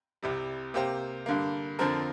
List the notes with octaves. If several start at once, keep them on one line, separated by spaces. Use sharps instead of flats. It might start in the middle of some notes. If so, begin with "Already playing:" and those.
C2 C3 G3
C3 A#3 G4 C5
G2 D3 A#3
F2 D3 F3 C4 A#4